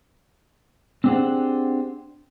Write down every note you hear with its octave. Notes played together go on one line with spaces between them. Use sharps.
C4 D4 G4 G#4 C5 F#5